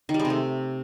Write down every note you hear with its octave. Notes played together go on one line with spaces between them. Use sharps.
D#3
G3
G#3
C3
A3